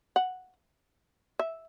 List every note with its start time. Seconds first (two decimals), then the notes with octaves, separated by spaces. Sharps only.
0.16 F#5
1.39 E5